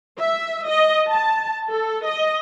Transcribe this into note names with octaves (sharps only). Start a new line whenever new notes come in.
E5
D#5
A5
A4
D#5